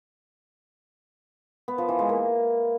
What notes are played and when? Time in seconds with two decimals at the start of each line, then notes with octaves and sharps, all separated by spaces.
1.68 B3
1.78 F3
1.89 E3
1.99 G#3
2.09 A#3